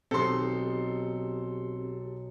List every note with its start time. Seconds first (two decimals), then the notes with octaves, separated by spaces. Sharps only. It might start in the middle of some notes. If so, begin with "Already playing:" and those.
0.11 B1 B2 C4 G4 A4 C6